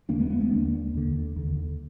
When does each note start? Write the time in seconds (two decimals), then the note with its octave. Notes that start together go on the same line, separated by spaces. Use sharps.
0.09 D#2 D3 A#3 D4
0.19 G#3 B3
0.30 G#3 B3
0.41 G#3 B3
0.51 D#2 D3 A#3 D4
0.94 D#2 D3
1.36 D#2 D3